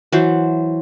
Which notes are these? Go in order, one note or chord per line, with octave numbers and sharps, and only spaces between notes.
E3 F#3 C5